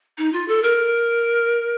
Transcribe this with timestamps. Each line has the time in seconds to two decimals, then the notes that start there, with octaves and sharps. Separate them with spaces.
0.18 D#4
0.33 F4
0.48 A4
0.63 A#4